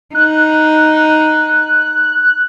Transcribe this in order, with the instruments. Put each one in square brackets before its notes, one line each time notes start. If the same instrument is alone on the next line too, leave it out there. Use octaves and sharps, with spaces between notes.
[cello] D#4 [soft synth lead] F#6